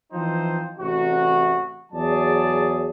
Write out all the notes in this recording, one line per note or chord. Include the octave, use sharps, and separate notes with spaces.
E3 F3 C4 D#4 C5
A1 C3 F#4
E2 F#3 G#4 D5 A5